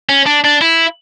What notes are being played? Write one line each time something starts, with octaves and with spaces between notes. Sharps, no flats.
C#4
D4
D4
E4